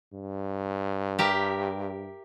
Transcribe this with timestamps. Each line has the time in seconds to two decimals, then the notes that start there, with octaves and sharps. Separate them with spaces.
0.13 G2
1.19 G4 A#4 E5